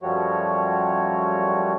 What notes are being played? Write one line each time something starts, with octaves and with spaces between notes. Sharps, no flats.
F#2 F3 G3 A3 F#4 C#5